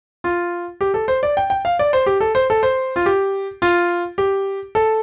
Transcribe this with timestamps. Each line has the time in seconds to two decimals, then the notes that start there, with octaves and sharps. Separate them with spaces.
0.24 F4
0.81 G4
0.94 A4
1.08 C5
1.23 D5
1.37 G5
1.50 G5
1.65 F5
1.79 D5
1.93 C5
2.06 G4
2.20 A4
2.35 C5
2.50 A4
2.63 C5
2.96 F4
3.06 G4
3.62 F4
4.18 G4
4.75 A4